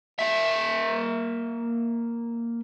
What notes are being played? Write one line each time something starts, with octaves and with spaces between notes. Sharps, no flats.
A#3 E5